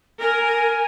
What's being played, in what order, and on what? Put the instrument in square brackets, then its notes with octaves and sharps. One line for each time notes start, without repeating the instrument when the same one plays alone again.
[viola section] A#4 [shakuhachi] G#5